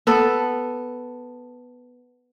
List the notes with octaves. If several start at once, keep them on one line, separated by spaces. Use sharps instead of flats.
B3 A4